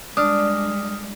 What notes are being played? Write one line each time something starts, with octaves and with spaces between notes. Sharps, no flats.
G3 G#3 D4 D#6 F6